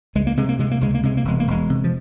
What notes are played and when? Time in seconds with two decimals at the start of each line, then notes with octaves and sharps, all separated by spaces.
0.15 C#2 G#3
0.27 A#3
0.37 C3 G#3
0.49 A#3
0.59 C3 G#3
0.71 A#3
0.81 C#2 G#3
0.95 A#3
1.03 C3 G#3
1.17 A#3
1.25 E1 G#3
1.40 A#3
1.47 E1 G#3
1.70 C3
1.84 F3